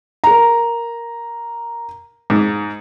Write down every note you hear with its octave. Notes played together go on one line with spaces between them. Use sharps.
A#4 A#5
G#2